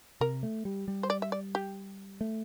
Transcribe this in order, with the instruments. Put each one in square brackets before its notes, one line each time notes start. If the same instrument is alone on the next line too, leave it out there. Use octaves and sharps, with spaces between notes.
[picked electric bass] C3 [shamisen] A#4
[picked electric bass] A3
G3
G3
[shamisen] C5
D5
E5
D5
G4
[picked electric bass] A3